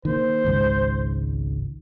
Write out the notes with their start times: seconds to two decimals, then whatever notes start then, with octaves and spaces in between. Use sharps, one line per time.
0.05 D#3 A#3 C5
0.45 G#1 C#2 G#2